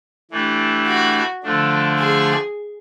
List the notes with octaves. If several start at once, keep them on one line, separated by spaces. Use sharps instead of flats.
E3 A3 D4 G4
F#4
D3 F3 A3 D4
G#4